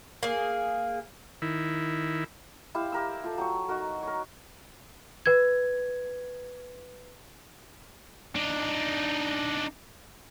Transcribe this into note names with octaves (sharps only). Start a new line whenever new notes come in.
A#3 G#4
D#3 E4
E4 G4 C5 F5
G4 A#4 E6
F4 A4
F#3 G5 C#6
D#4 F#4 A#4
A#4 C#5
B4 G#6
D4 D#4